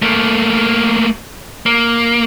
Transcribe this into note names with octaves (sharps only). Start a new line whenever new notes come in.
A3 A#3
A#3